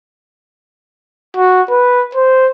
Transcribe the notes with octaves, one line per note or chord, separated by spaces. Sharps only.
F#4
B4
C5